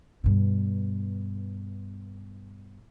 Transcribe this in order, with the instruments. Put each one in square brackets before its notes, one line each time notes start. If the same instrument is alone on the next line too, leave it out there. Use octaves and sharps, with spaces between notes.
[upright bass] G2 B2